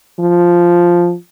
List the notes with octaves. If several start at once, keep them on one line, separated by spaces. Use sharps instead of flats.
F3